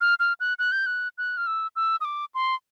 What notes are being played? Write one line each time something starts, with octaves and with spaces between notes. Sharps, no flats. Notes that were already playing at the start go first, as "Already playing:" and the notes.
F6
F6
F#6
F#6
G6
F#6
F#6
F6
E6
E6
D#6
D6
C6